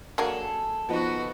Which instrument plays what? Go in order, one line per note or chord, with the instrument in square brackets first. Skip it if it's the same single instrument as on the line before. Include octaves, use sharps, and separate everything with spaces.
[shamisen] F#3 A#3 D4 [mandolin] G#4 A4
[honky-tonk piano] F3 B3 D#4 [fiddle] F#4 B4